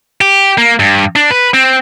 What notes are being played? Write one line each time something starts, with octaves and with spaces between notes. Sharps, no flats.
G4
A#3
G2
D4
B4
C4